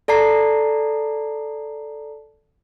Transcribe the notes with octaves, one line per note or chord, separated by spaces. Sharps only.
A4 D5 A5 A#5 C7